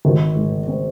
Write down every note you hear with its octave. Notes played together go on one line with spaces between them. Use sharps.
G#1
G#2
C4